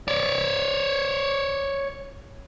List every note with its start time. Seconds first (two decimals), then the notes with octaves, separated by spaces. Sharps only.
0.08 C#5 D5